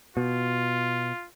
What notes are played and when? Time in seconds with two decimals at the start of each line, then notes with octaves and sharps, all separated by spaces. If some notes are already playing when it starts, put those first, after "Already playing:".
0.17 B2 F4